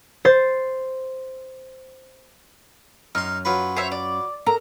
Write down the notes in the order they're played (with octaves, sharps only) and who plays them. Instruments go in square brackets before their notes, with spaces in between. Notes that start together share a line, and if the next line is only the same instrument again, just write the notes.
[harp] C5 A6
[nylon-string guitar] F#2 [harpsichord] D#4 C6 [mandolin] F6
[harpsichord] F#3 F4 B4
[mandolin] C5 C#5 E5
D5
[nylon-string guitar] A4 A#4 [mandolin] A#5